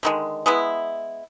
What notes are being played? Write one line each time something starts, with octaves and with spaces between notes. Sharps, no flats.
D3 D#3 G#3
G#3 B3 E4